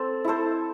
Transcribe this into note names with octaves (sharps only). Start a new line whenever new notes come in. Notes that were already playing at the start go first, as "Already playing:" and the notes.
Already playing: C4 A4
E4 A4 C5